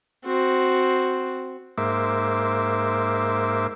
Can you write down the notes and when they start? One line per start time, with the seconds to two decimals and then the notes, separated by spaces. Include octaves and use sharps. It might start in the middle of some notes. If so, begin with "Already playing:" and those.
0.25 C4 F#4
1.78 G#2 A#3 C5 E5 D6